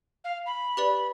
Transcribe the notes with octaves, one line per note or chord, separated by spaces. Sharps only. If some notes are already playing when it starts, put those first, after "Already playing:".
F5
B5
G4 B4 D5